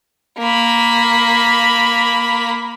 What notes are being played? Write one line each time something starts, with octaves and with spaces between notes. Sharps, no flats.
A#3 B5